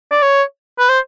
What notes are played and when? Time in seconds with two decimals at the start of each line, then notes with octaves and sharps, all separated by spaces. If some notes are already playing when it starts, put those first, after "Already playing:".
0.11 D5
0.22 C#5
0.79 B4
0.89 C5